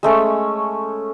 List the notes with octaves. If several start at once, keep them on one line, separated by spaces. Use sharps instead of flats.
G#3 A3 C#4